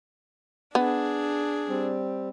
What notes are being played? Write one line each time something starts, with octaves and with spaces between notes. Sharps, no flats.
B3 D4 G#4
G3 C4